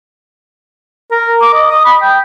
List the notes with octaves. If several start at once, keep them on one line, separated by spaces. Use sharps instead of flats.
A#4
D6
D#5
D#6
B5
G5